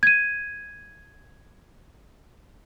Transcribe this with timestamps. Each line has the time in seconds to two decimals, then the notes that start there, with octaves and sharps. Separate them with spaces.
0.03 G#6 D#7